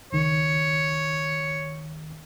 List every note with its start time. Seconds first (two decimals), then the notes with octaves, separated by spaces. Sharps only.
0.12 C#2 D#3 C#5